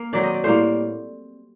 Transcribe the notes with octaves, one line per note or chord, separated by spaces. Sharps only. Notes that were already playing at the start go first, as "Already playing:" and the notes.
Already playing: A#3 A#4
D#3 F#3 C4 D5
D#5
D5
A2 G3 A#3 C5